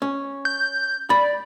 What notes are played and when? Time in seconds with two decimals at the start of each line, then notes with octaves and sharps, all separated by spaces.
0.02 C#4
0.45 G6
1.10 D5 B5